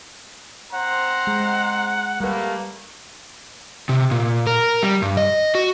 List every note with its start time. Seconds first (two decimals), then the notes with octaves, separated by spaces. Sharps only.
0.73 C4 C5 F#5 A#5
1.27 G#3 G#4
2.20 G3 A3 A#3 B4
3.89 C3
4.11 A#2
4.47 A#4
4.83 G3
5.02 G2
5.17 D#5
5.55 F#4